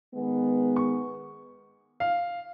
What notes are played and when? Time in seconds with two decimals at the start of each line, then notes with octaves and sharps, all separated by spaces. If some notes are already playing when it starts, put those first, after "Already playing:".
0.13 D#3 G#3 B3
0.76 C#6
2.00 F5